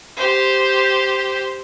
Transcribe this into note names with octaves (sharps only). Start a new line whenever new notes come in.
G4 C5